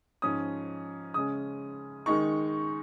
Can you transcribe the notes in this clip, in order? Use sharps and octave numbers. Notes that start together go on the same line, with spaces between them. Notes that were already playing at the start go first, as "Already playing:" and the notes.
G#2 F3 C#4 D#6
C#3 G#3 C#4 D#6
D#3 G#3 D#4 C#6